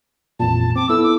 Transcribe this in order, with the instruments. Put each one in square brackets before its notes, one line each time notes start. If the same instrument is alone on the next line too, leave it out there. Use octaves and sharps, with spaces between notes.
[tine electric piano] A1 F2 A#2 [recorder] A5
[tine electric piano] C4 [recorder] D6
[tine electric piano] B3 E4 A4 [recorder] E6
[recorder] D6